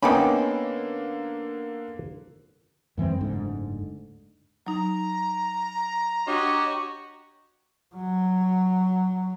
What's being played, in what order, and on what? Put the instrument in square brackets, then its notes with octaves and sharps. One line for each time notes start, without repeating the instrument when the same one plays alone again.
[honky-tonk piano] D3 A#3 [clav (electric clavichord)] B3 C#4 [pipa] D#4 G4 B5
[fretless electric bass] F#2 E3 G#3 C4
F#1 D2 G#2 D3
[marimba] F#3 D#4 [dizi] A#5
[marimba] D4 [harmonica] F#4 C#6 [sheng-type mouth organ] G4 C#5 D#5
[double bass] F#3